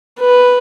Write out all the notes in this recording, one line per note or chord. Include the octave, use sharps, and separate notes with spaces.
B4